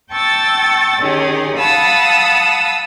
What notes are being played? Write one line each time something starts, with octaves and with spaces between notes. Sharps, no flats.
G5 A5 C#6 E6 A6
D#3 C#4 G4 G#4
F5 F#5 A5 B5 D#6 E6